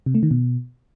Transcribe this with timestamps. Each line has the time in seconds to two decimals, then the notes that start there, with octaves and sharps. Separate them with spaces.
0.06 C3
0.15 A3
0.23 D#3
0.31 B2